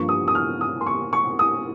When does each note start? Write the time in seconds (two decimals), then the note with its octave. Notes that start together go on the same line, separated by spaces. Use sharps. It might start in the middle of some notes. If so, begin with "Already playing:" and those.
Already playing: G2 F3 A#3 C#6
0.09 D#6
0.28 D#6
0.35 F6
0.61 D#6
0.81 C6
0.87 C#6
1.13 C#6
1.39 D#6